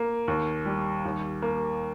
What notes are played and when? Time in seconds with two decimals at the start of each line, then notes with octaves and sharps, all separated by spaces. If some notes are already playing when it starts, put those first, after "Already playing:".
Already playing: A#3
0.28 D#2
0.65 G3
1.05 D#2
1.42 A#3